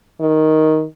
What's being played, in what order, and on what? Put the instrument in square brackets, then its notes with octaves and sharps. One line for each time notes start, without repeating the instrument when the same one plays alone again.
[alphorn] D#3